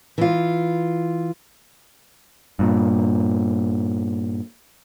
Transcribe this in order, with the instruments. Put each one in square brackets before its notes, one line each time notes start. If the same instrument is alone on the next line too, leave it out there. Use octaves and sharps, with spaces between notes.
[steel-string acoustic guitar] E3 F4
[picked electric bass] G2 A#2